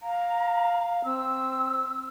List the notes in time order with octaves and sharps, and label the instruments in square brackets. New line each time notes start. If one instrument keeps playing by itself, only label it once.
[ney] F5 [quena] A#5
[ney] C4 [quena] E6